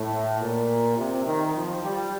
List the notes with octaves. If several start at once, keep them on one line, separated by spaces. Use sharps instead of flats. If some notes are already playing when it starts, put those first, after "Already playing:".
Already playing: A2
A#2
C3
D#3
F3
G3